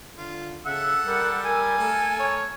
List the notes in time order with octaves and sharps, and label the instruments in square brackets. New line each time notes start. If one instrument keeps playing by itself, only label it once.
[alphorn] D3 [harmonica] F4
[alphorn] C#3 [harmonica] A4 E6 [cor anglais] E5 [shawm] F#5
[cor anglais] G3 [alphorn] A#4
[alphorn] A#4 [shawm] G#5
[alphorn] A3 [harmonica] A4 A#4
[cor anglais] C#5